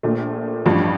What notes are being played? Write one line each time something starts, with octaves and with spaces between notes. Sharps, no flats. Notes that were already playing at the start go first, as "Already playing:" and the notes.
A#1 A#2 A3
A1 G2 F3